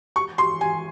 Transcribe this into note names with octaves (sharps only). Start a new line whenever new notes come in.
C#6
C6
G#5